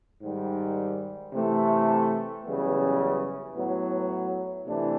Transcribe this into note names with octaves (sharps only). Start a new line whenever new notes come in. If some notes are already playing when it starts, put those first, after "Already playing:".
G#2 D#3 G3
C3 E3 A3
F#2 C#3 E3 G3 B3
A2 F#3 B3
C3 E3 A3 D4